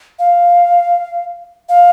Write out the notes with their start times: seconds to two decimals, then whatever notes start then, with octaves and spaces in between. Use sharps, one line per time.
0.19 F5
1.69 F5